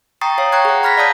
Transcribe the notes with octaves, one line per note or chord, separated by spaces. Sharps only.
G5 A#5 C#6 D#6 A6 C7
C#5 F5 C7
G5 A#5 C#6 F#6 G#6
G#4 F#5
A#5 B5 F6 G#6 A#6 B6
D5 F5 A5 D#6 G6